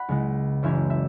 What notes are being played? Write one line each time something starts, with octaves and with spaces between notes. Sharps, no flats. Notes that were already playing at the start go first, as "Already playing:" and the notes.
Already playing: F#5 B5
C#2 C#3 G#3 E4
F#1 F#2 E3 C#4 E5 G#5
E5